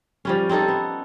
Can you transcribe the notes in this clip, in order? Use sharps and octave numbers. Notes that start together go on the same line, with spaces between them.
F3 G3 C#4
C4 C#4 D#4 A4
B3